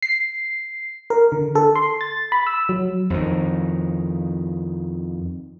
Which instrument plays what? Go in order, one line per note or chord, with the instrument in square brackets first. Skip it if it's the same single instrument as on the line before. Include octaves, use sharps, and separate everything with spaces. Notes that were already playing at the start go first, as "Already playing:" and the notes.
[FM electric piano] C7
A#4
D3
A4
C6
A6
B5
E6
F#3
[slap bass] F2 D#3